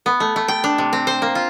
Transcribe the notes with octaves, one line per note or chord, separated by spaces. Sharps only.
B3
A3
A3
G5
D4
C3
C4
C5
A#3
F4